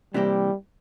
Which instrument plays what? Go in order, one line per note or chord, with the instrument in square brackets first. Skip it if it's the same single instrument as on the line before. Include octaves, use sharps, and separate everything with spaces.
[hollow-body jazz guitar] C3 E3 A#3 E4 G4 [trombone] G3